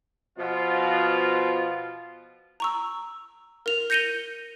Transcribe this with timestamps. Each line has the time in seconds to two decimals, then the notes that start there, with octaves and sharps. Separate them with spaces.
0.37 B2 F3 F4
2.60 A#5 C#6 E6
3.66 A#4 F7
3.90 G6 A#6 C#7 D#7 F7 G7